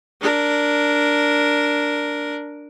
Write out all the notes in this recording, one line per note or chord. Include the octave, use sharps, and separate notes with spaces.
D4 A#4